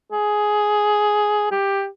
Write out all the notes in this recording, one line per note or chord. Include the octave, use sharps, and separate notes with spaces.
G#4
G4